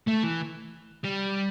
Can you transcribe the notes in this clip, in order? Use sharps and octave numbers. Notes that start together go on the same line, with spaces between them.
A3
E3
G3